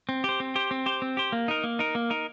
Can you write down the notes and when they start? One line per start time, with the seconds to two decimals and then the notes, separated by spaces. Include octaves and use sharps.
0.09 C4
0.24 G4 C5
0.40 C4
0.55 G4 C5
0.71 C4
0.86 G4 C5
1.02 C4
1.17 G4 C5
1.32 A#3
1.48 D#4 A#4
1.64 A#3
1.79 D#4 A#4
1.95 A#3
2.10 D#4 A#4